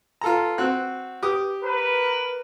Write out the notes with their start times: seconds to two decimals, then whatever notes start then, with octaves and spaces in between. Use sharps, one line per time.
0.21 F4 A4 A#5
0.58 C4 F#4 F#6
1.23 G4 D6 D#6
1.62 A#4 B4